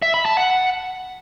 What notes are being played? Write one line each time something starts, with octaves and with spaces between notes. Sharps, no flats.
E5
B5
A5
F#5